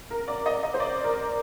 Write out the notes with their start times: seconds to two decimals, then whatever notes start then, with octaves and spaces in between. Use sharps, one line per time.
0.10 A#4
0.28 D5
0.46 D#5
0.63 D#5
0.74 C5
0.80 D5
1.04 A#4